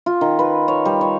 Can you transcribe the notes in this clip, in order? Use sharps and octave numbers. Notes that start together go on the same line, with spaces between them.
F4
D#3
B4
C#5
G3
C#5